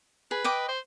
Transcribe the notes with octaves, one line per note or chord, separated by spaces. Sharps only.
G#4 B4
D#5 G5 D6
C5